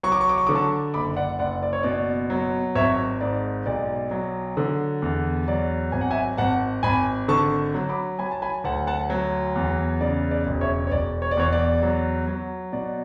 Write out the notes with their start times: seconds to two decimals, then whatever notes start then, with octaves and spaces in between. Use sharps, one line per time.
0.03 F#3 C#6
0.12 D6
0.21 C#6
0.29 D6
0.38 C#6
0.47 D3 D6
0.55 A5 C#6
0.94 F#1 B5 D6
1.16 D5 F#5
1.39 F#1 D5 F#5
1.63 D5
1.73 C#5
1.83 B2 D5
2.30 F#3
2.75 G#1 C#5 E5
3.21 G#2 D5
3.66 B1 D5
4.11 F#3
4.57 D3
5.02 E2
5.48 F#3 D5
5.92 G#1 G#5
6.01 F#5
6.11 E5 G#5
6.37 G#1 F#5 A5
6.83 G#1 G#5 B5
7.28 D3 A5 C#6
7.74 F#3
7.89 B5 D6
8.19 F#3 G#5 B5
8.32 A5
8.42 G#5 B5
8.64 D2 F#5 A5
8.87 F#5 A5
9.10 F#3
9.56 E2
10.01 C#3 D5
10.31 D5
10.47 E1
10.61 C#5 E5
10.87 C#5
10.91 E1 D5
11.22 C#5
11.31 D5
11.37 E2 C#5
11.53 D5
11.83 F#3
12.27 F#3
12.73 B2 D5